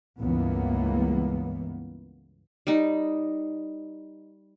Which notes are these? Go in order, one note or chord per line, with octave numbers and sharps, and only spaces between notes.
C#2 G2 E3 A#3 B3
G3 D#4